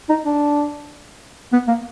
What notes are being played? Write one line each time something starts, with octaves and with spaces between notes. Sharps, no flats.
D#4
D4
B3
A#3